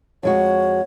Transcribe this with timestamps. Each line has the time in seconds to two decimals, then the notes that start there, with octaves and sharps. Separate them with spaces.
0.23 F2 G#3 F#4 C#5